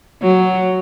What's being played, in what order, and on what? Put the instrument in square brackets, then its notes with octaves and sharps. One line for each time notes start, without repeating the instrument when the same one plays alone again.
[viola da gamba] F#3